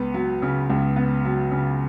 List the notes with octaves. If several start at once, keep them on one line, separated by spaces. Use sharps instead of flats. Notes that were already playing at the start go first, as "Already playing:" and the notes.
Already playing: C#2 B3
F#3
C#3
C#2
B3
F#3
C#3